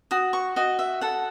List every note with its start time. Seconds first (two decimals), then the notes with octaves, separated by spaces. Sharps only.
0.11 F#4 D#6
0.33 C#6
0.56 F#4 D#5
0.79 E5
1.01 A4 F#5